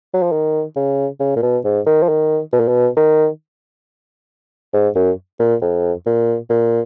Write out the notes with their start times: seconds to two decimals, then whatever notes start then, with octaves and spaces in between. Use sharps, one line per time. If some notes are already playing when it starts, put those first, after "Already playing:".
0.14 F#3
0.23 F3
0.32 D#3
0.76 C#3
1.20 C#3
1.37 A#2
1.43 B2
1.65 G#2
1.86 D#3
2.03 F3
2.09 D#3
2.53 B2
2.60 A#2
2.68 B2
2.97 D#3
4.73 G#2
4.96 F#2
5.40 A#2
5.62 F2
6.06 A#2
6.50 A#2